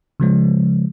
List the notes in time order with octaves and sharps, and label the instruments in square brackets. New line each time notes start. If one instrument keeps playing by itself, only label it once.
[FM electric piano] C#3 F3 G#3